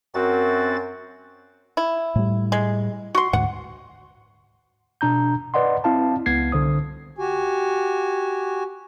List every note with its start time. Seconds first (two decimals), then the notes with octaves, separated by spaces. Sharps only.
0.15 F#2 C4 F#4 A6
1.77 E4
2.16 A2 G3
2.52 G#3
3.15 F#4 C6
3.33 D2 G#2 F#5
5.01 B2 D4 A#5 G6
5.54 B4 D5 D#5 F#5 C6
5.84 C4 E4 F5 A5
6.26 C#2 B3 G#6 C7
6.52 C2 D3 C5 D#6
7.18 F#4 G4 G#5